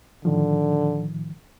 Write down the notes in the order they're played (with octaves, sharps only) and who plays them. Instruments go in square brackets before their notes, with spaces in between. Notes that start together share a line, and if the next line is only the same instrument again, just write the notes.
[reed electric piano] A2 D#3 F3 [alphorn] D3